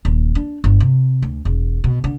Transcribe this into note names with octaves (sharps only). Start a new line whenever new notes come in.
D#1
D4
G1
C3
D2
E1
B2
D3